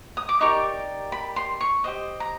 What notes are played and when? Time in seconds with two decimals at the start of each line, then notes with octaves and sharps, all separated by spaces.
0.17 D#6
0.29 D6
0.41 D#4 G4 A#4 D5 C#6
1.12 B5
1.36 C6
1.61 C#6
1.84 G4 C5 D#5
2.20 A#5